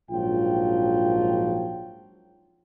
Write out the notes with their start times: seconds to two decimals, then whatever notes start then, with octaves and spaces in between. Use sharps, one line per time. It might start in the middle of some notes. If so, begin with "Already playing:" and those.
0.11 A#1 G#2 F3 F#3 F4 G5